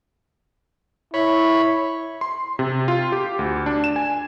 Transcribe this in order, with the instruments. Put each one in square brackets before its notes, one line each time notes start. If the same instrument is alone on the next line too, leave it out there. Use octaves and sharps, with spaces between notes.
[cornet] E4 [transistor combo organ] C#5 B5
[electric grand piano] C6
C3
F4
G4
D2
D4
E7
G#5